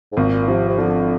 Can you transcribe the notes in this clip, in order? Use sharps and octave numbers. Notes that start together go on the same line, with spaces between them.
G#2
G#1 A#2
C3 F3
C3
D3 F3